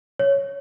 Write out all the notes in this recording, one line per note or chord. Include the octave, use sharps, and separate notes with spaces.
C#5